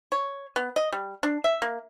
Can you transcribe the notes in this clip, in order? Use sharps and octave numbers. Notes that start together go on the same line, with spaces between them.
C#5
B3
D#5
G3
D4
E5
A#3